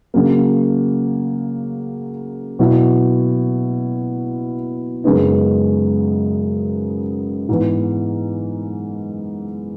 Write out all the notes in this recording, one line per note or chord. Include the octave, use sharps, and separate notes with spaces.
C#3 F#3 A#3
B2 F#3 B3 E4
F#2 C#3 G#3 B3 D#4
G#2 E3 B3